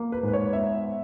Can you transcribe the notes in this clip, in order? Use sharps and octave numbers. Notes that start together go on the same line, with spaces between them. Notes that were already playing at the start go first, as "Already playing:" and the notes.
Already playing: A#3
B4
G#2
B4
C#5
B3 E5